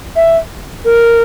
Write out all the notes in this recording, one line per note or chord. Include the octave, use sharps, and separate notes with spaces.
E5
A#4